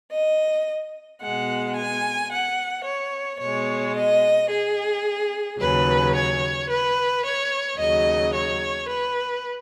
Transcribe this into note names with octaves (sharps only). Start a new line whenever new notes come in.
D#5
B2 G#3 F#5
G#5
F#5
C#5
B2 C#5
G#3
D#5
G#4
D#2 C#3 F#3 B4
C#5
B4
C#5
D#2 C#3 F#3 D#5
C#5
B4